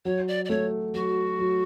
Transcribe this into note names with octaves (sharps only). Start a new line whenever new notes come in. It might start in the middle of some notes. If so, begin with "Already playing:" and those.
F#3 C#5
D5
D5
A3 C#5
F#3 F#4
F#3